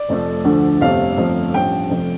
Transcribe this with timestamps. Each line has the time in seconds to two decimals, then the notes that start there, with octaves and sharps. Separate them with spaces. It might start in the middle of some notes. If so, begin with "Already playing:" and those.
Already playing: D5
0.08 F1 F2 F3 A3
0.44 D2 D3 F3 A3
0.81 G1 F2 C3 A3 F5
1.18 G1 F2 F3 A3
1.54 A1 G2 F3 G5
1.90 F1 F2 F3